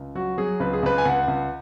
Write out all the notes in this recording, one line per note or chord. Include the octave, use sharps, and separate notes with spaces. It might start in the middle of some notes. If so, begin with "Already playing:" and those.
Already playing: C#2
F#3 F#4
F#3 G#4
C#2 B4
G#4
C#2 B4
G#5
C#2 F#5
C#2